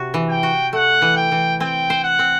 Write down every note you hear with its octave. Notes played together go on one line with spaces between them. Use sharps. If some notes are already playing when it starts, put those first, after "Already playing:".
Already playing: C3 F#4
E3
G5
F#4
A3 F#5
E3
G5
E3
C4 G5
C5
F#5
C4